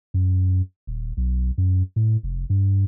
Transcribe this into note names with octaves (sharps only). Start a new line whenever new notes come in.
F#2
D#1
B1
F#2
A2
F1
G2